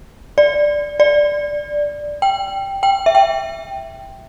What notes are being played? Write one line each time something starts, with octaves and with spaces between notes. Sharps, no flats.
D5
D5
G5
G5
E5
G5